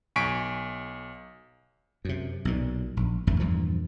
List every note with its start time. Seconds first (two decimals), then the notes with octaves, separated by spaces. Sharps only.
0.16 B1 G#5 C#6 B6 D7
2.05 F#2 C3
2.45 B1 A#2
2.97 A#1
3.27 G1 E2 G2 A3
3.40 E2 G2 A#2 F3